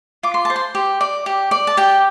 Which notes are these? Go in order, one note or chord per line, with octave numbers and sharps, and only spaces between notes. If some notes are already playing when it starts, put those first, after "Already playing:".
F4 D6
C6
C5 A5
C6
G4
D5
G4
D5
A5
G4 G5